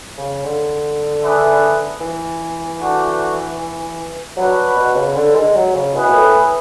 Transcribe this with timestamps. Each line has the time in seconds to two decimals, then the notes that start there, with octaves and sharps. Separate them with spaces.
0.18 C#3
0.44 D3
1.22 D4 G#4 B4 E5
2.00 E3
2.79 A3 D4 F#4
4.36 F#3 D4 F#4 B4
4.76 B2
4.95 C#3
5.15 D3
5.35 G#3
5.55 F#3
5.74 C#3
5.94 B2 E4 G#4 B4
6.08 B2
6.14 A2